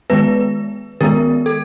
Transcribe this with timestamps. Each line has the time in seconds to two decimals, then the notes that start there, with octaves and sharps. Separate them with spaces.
0.10 D#3 G#3 B3 B4
1.01 D#3 G#3 B3 A#4
1.46 A4